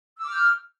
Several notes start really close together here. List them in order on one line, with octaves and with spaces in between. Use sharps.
E6 D6 F6 G6